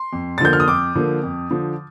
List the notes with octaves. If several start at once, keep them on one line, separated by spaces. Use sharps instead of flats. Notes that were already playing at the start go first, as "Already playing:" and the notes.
Already playing: C6
F2
A6
D3 F3 A#3 G6
F6
D#6
F2 D6
D3 F3 A#3
F2
D3 F3